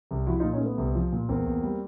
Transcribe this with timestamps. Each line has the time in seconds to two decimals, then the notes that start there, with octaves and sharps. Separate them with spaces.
0.11 C2
0.27 F3 E4 F#4
0.39 D#4 F4
0.44 A#2
0.53 C#4 D#4
0.61 A3 B3
0.78 C2
0.95 F3
1.12 A#2
1.29 E2 A#3 C4
1.46 E2
1.62 G3